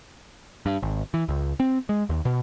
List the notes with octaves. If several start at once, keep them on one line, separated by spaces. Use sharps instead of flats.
G2
G#1
E3
C#2
C4
G#3
D#2
B2